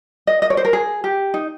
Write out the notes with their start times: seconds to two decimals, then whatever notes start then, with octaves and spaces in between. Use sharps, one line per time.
0.27 D#5
0.42 D#5
0.50 C#5
0.57 C5
0.65 A#4
0.73 G#4
1.04 G4
1.34 D#4